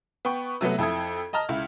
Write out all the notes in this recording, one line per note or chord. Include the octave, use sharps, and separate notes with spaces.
B3 G5 C#6
C3 F#3 A3 B3
F2 E4 A4 D#6 G#6
D#5 A5 A#5 F6
C#2 E4